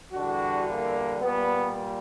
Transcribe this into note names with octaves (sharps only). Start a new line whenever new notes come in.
E2 D3 G3 D4 F#4
A#3
A#2 G3 B3